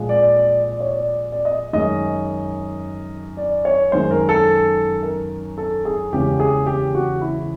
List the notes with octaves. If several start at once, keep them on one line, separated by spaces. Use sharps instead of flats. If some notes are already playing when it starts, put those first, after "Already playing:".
Already playing: A#2 F3 G#3
D5
D5
D5
C#5
D5
D5
D#5
F#2 D#3 G#3 D#5
D5
C#5
F#2 D#3 G#3 C5
A#4
A4
A#4
A4
G#4
E2 C#3 E3 G#3 G4
G#4
G4
F#4
E4